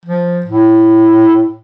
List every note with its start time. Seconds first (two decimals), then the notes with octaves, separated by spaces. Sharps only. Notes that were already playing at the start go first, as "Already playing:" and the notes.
0.05 F3
0.46 A2